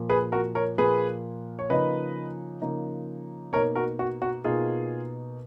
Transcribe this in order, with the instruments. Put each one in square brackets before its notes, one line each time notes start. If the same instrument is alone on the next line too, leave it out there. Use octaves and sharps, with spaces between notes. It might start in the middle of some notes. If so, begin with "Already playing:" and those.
Already playing: [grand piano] A#2 F3 A#3
G#4 B4
F#4 A#4
A#4 C#5
A#2 F3 A#3 G#4 B4
C#5
C#3 F3 A#3 D#4 B4 D#5
C#3 F3 A#3 D#4
B2 A#3 D#4 A#4 C#5
F#4 A#4
F#4
F#4
B2 A#3 D#4 F4 G#4